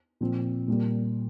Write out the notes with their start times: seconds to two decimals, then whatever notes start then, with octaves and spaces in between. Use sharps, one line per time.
0.21 A#2 F3 C4
0.68 A#2 G3 A#3